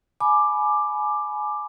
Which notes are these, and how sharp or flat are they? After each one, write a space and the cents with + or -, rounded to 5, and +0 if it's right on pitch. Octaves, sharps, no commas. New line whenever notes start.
G#5 +25 B5 -5 D6 +10